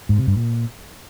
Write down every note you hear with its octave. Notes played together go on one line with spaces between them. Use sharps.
G#2
C3
G2
A#2